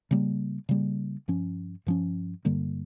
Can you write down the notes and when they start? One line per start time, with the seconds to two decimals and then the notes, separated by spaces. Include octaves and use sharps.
0.11 C#3 G3 A#3
0.69 C#3 G3 A#3
1.28 G2 F3 C#4
1.87 G2 F3 C#4
2.45 G2 D3 G3 A#3